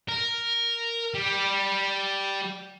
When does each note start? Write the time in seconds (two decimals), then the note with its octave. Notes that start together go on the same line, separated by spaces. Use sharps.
0.09 A#4
1.14 G3